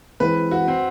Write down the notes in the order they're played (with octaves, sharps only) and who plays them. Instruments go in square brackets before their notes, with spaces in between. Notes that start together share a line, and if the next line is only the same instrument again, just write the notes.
[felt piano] E3 G#3 C4 [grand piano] B4
[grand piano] F#4
C4